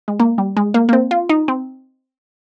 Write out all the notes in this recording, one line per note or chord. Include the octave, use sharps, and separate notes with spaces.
G#3
A#3
G3
G#3
A#3
A#3
C4
F4
D#4
C4